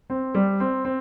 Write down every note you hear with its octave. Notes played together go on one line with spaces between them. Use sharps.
C4
G3
C4
C4